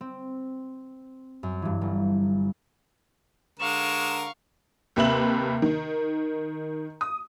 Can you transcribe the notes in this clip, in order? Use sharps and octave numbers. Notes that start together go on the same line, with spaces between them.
C4
F#2
G2 E3
G1
D3 G#3 A#4 F5 C#6 E7
D#2 C3 B4 E5 E7 F#7
D#3
D#6